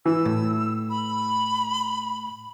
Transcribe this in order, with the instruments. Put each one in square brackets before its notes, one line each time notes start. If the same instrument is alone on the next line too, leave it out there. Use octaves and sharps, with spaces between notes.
[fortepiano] E3 [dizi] E6
[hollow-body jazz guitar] A2
[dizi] B5